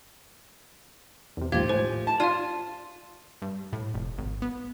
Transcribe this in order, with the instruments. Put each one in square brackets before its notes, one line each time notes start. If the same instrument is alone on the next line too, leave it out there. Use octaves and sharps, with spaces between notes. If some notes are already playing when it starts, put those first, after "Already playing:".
[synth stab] E2 C3
[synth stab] A#1 D#2 G#2 [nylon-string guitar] F3 G4 [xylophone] F5 G#6
[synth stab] A2 G#5 [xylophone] C5
[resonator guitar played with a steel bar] A5
[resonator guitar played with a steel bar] F4 [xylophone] D5 F5 [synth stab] D#7
[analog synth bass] G2
A2
F1
G#1
B3